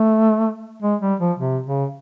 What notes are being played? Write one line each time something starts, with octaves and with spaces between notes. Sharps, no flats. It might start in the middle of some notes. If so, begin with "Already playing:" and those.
Already playing: A3
G#3
G3
F3
C3
C#3